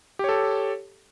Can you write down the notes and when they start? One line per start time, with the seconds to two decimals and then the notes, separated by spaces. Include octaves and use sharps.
0.19 G4
0.24 C#5
0.29 A4